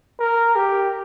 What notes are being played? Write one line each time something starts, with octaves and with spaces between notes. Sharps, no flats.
A#4
G4